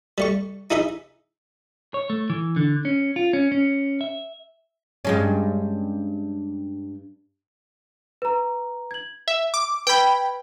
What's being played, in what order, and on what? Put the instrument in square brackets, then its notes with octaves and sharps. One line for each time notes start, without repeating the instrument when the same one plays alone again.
[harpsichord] G3 A3 C#6
D#4 E4 G#4 D#5 E5
[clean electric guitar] C#5
A3
E3
D3
C#4
F4
C#4
C#4
E5
[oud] G2 G#3 C#4
[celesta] B4 A#5
G#6 F#7
[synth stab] E5 [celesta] E6
[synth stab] D6
[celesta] B4 G#6 [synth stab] G5 B5